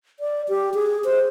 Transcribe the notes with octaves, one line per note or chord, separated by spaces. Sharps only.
D5
G4
G#4
C5